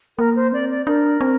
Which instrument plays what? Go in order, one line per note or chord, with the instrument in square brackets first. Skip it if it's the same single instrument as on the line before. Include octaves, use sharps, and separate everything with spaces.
[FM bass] A#3 [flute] A#4
[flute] C5
[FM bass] C4 [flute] D5
[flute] D5
[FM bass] D4 [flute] A#4
[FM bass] C4